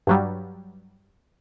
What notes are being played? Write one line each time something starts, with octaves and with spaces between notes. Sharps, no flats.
G2 F#3 G3